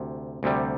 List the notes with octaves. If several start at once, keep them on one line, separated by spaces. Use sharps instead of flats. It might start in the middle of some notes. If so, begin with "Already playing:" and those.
Already playing: D2 C3
D2 C3 G3